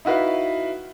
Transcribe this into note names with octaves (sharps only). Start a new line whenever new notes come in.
D#4 E4 F#4 B4 F5